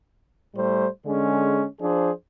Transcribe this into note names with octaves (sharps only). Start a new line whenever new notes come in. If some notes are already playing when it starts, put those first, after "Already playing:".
A2 G3 A3 C5
D3 G#3 C#4 G#4
F3 D4 G#4 C5